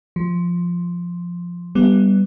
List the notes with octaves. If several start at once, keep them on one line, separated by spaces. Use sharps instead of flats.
F3
G3 B3